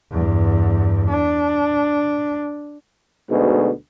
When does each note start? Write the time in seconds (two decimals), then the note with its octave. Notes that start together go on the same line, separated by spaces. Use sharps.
0.12 E2 G2
1.09 D4
3.30 D2 G#2 B2